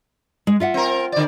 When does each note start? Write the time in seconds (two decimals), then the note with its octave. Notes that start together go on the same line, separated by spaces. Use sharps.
0.47 G#3
0.60 F4 E5 F#5
0.74 C4 A#4
1.12 D3 D5